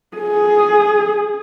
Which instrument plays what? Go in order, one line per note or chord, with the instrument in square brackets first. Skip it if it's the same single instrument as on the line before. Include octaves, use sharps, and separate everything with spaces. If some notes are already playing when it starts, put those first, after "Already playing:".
[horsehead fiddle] G#4